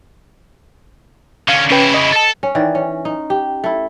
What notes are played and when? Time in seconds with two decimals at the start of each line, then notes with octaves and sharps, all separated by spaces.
1.49 D3 C#4 F5
1.70 C#3 C#4 E4 B4 G5
1.94 D#5
2.13 A4 A5
2.43 C#4
2.55 D#3 E3 D5
2.75 C#4
3.05 D#4
3.30 G4
3.64 A3 E4